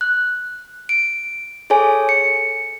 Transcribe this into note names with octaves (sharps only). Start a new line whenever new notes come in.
F#6
D7
G#4 A4 C#5 G#5
C#7